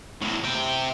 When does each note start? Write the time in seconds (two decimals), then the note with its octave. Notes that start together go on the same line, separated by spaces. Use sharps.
0.21 E2 A2
0.44 C3 G5